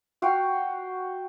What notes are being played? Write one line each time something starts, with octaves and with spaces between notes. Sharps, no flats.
F#4 F5 G5